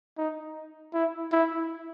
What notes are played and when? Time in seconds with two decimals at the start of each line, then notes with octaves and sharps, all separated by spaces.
0.18 D#4
0.94 E4
1.32 E4